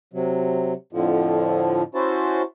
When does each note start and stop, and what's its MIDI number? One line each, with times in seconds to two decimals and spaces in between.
0.13 0.73 48
0.13 0.73 54
0.93 1.82 41
0.93 1.82 45
0.93 1.82 50
0.93 1.82 53
1.95 2.42 61
1.95 2.42 64
1.95 2.42 66
1.95 2.42 72
1.95 2.42 81